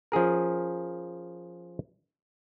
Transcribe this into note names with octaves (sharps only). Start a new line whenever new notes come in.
F3 C#4 G#4 A#4